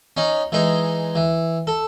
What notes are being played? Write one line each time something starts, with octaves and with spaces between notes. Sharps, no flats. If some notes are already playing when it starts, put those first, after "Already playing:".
C#4 D#4
E3 G#3 D#4
E3
A4